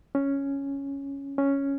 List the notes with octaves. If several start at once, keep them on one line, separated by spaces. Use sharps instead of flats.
C#4
C#4